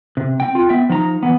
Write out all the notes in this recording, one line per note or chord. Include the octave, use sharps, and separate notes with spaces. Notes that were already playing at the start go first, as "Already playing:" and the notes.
C3
C4 G5
F4 G5
B3 E5 G5
F3 D#4 A#5
E3 B3